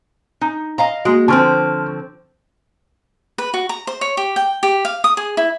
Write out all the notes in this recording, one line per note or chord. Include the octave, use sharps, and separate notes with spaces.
D#4
D#5 F5 A#5
G#3 A#3 F#4
D3 F3 C4 A5 C#6 F6
B4
F#4
A#5
C5
C#5
G4
G5
G4
F5
D#6
G#4
E4